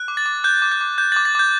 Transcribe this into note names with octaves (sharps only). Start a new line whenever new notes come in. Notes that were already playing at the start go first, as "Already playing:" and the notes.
Already playing: F#6
D6
A6
D6
F#6 G6
D6
G6
D6
G6
A6
D6
A6
D6 G6